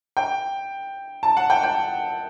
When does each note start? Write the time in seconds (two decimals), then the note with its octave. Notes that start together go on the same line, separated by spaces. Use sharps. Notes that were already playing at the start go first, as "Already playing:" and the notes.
0.17 G5
1.23 A5
1.37 F#5
1.50 G5
1.63 G5